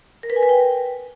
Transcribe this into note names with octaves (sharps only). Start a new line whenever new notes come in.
A#4
B4
G#5
B4
G5